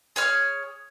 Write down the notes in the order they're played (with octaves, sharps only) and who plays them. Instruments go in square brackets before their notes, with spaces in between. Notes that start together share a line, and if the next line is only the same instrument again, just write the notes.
[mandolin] G#4 C#5 F6